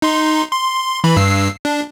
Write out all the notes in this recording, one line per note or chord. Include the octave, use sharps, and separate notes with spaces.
D#4 C6
C6
E3 B5
G2 E6 C7
D4